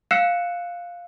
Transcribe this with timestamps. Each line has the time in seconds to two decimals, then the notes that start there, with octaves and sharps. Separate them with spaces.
0.11 F5 E6 F#6 C7 C#7 E7